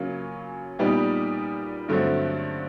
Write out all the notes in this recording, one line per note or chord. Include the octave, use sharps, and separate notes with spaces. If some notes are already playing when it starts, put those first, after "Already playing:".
Already playing: C#3 F#3 A#3 C#4 F4
A#2 G3 B3 D#4 G4
G2 D3 F#3 A3 C4